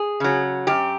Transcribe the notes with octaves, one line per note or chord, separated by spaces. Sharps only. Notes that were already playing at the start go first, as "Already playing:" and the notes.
Already playing: G#4
C#3 F#3
F#2 G4